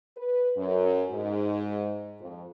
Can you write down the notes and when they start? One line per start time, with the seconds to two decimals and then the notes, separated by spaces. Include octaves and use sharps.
0.17 B4
0.56 F#2
1.11 G#2
2.21 F2